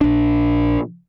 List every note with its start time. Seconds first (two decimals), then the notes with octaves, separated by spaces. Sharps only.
0.01 A#1 D4